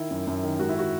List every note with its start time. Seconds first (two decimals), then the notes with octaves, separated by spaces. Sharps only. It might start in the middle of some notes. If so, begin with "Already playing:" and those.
Already playing: D#3 E4
0.11 F#2
0.27 F#2
0.43 D#3
0.59 G#2 F#4
0.69 E4
0.75 D#3 F#4